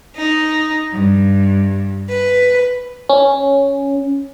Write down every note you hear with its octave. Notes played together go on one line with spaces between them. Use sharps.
D#4
G2
B4
C#4